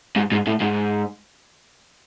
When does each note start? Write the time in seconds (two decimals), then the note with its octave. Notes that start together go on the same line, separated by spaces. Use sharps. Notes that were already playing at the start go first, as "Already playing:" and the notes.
0.16 G#2
0.32 G#2
0.47 A2
0.60 G#2